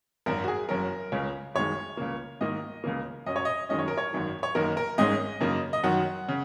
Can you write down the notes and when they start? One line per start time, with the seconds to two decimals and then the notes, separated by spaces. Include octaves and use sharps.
0.26 G#1 F#2 F#3 A#4
0.44 F#4
0.48 G#4
0.69 F#1 F#2 F#3 C#4 A#4
1.12 C#2 C#3 G#3 C#4
1.55 F#1 F#2 D#3 G#3 C#5
1.97 C#2 C#3 A#3
2.41 G#2 D#3 A#3 D#5
2.84 C#2 C#3 A#3
3.26 F#2 F#3 C#4 D#5
3.36 C#5
3.45 D#5
3.69 F#2 D#3 G#3 C#4 D#5
3.79 C#5
3.88 A#4
3.98 C#5
4.13 G#1 F#2 D#3
4.43 C#5
4.55 F#1 F#2 D#3 A#3 D#4 A#4
4.77 A#4
4.98 G#1 G#2 G#3 C#4 D#5
5.41 F#2 C#3 A#3 D#4
5.73 D#5
5.84 F#2 D#3 F#3 F#5
6.28 C#3